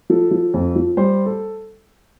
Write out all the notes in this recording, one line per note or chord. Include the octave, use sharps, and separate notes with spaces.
F3 A4
F3
F2
F3
G3 C5
A4